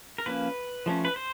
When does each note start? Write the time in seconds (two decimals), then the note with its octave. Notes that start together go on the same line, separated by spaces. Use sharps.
0.18 A#4
0.26 F3 A#3 C#4 B4
0.86 F3 A3 C#4
1.05 B4
1.16 C5